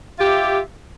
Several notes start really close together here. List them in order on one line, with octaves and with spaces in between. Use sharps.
F4 G4 E5